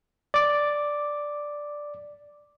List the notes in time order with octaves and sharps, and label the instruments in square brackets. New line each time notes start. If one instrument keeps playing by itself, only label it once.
[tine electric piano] D5 D6